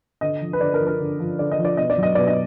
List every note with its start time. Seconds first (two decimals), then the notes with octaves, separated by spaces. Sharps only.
0.21 D3 D#5
0.41 F3
0.53 B4
0.61 D3 D5
0.74 A#4
0.80 F3
0.87 A#4
1.00 D3
1.20 F3
1.39 D3 D5
1.51 D#5
1.59 F3
1.65 D5
1.77 B2 D#5
1.90 D5
1.98 F#3 D#5
2.15 B2 D5
2.28 D#5